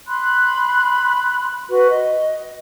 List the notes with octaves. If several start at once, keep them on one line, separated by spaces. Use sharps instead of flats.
B5 C6 F#6
F#4 B4
D#5